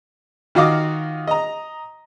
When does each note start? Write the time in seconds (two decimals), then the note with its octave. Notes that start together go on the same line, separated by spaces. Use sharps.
0.55 D#3 F4 F#4 D#5 F5 D6
1.27 D#5 A#5